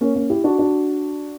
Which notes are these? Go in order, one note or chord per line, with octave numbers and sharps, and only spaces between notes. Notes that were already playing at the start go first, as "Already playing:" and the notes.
A#3 C#4
A#3 C#4
E4 G4
D4 F#4
D4 F#4